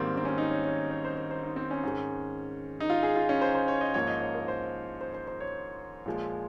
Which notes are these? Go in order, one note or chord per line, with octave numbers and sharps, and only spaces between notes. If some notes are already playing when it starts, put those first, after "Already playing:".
Already playing: G#2 D#3 G3 A#3 C4
C4
C#4
D#4
C#5
C#5
C#5
C5
C5
C5
D#4
C4
C#4
G#2 D#3 G#3
D#4
F4
G#4
F4
C#4
C5
C5
C#5
D#5
G#2 F3 A#3 C#5
D#5
C#5
A#4
C5
C5
C5
C5
C#5
A#2 F3 G#3